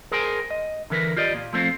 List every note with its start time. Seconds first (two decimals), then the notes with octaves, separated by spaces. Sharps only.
0.11 G#4 A#4 C5 G5 G#5
0.50 D#5
0.90 D3 E3 A#4 B4
1.17 F4 G4 D5 D#5
1.34 A#2
1.53 F3 A3 C4 F4